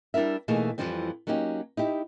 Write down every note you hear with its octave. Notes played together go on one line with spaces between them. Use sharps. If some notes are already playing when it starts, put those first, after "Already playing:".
G3 D4 E4 A#4 E5
B2 E3 A3 A#3 D#4 G#4
F2 G#2 E3 F3 G3 C4
F#3 A#3 C#4 D#4 G4
D#4 E4 G4